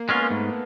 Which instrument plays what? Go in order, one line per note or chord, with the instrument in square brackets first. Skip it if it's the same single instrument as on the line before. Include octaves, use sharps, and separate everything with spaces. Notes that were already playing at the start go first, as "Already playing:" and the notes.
Already playing: [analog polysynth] A#3
[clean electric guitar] G#3 C#4 F4 [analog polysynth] B3
[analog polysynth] A#3
[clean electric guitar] G#2 [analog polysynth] A3